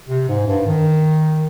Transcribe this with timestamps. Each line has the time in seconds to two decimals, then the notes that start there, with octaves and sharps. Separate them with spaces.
0.09 C3
0.29 G#2
0.47 G2
0.67 D#3